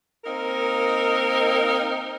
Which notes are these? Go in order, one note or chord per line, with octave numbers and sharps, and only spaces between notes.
A#3 C4 D#4 A#4